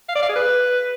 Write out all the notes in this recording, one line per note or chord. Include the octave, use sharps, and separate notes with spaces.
F5
D5
F5
G#4
B4